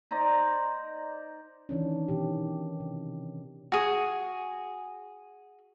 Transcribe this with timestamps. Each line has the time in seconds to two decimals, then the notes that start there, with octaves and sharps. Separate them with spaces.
0.11 D#4 C5 D5 A#5
1.69 D#3 E3 C#4 D4
2.08 B2 D#3 G4
2.80 C3
3.72 F#4 G#4